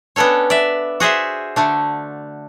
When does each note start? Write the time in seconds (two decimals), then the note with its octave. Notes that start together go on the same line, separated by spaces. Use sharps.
0.16 B3 C#4 D4 A4 C#5
0.50 D5 E5
1.00 F#4 G#4 C5 E5
1.56 D3 A3 D4